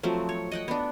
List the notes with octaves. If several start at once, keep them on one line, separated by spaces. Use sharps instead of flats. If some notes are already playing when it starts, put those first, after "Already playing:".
F3 F#3 A3 C4
C#5
D#5 F#5 G5
B3 D4